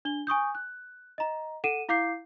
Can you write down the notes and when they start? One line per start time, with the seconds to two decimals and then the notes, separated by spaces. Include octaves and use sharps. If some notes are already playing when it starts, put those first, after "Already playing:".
0.05 D4 G7
0.27 G#5 C#6 D#6 G6
0.55 F#6
1.18 D#5 A#5
1.64 A4 F#5 D#7 E7
1.89 E4 F5 D6 G6 C7